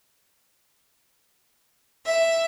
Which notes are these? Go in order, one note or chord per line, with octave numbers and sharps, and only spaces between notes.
E5